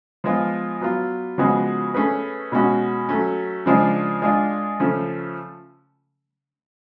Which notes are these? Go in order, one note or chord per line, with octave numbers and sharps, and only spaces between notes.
F3 G#3 B3 F4
F#3 B3 F4
C#3 F3 G#3 B3 F#4
A3 C#4 G#4 B4
B2 G#3 C#4 F#4
F#3 A3 C#4
C#3 F3 G#3 D4 F4
G#3 D4 F4
C#3 F3 A3 C#4